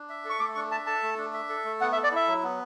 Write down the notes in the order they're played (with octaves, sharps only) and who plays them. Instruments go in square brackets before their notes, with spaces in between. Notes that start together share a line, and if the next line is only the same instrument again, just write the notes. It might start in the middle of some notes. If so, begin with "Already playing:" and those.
Already playing: [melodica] D4
E5
[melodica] A4 [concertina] C#6
[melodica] A3 [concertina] D6
[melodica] D4 [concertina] C#6
[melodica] E5 [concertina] A5
[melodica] A4 [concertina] A5
[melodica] A3
D4
E5
A4
A3
[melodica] B3 [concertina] F#5
[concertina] E5
[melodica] A4
[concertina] D5
[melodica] E4 [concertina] E5
[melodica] F#3
B3